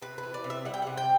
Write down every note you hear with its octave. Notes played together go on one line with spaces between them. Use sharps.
C3 B4
B4
E3
D5
C3
E5
G3 F#5
G5
C3 F#5
G5